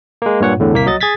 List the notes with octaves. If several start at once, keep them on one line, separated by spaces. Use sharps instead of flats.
G#3 A#3
G2 A#2 C#5 F#5
E2 A2 D3
C2 A#3 B6
F#3 D#5 A6
G#4 G#6 A6 B6